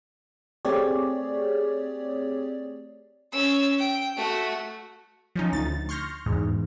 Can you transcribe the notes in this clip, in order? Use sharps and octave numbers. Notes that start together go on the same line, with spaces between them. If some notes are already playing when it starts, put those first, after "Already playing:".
A3 C4 G4 G#4 C#5 D5
C#4 E6
G5
A3 F#4
F3 C#4 D#4
D2 A6
C6 C#6 F6 G6 A#6
E2 G#2